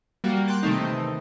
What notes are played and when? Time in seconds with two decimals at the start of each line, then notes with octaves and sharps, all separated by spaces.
0.24 G3 A#3 F#4
0.47 G5 C6 F#6 A6
0.63 C3 D#3 E3 A3 C4 D#4